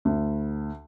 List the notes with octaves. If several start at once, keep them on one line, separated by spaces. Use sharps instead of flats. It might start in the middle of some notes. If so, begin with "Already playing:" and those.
D2